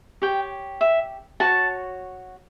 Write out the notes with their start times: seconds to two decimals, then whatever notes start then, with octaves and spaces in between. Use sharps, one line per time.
0.22 G4 C#5 G5
0.81 E5
1.40 F#4 C#5 A5